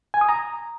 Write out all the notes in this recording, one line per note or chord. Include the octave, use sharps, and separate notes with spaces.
G#5
D#6
A#5